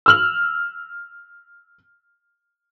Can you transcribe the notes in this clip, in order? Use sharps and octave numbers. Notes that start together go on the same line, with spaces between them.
E6 F6 F#7